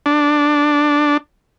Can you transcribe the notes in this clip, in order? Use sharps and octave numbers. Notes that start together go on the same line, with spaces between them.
D4